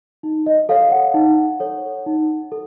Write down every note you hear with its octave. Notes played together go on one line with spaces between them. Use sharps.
D#4
D#5
A4 C#5 F5
F#5
D#4
A4 C#5
D#4
A4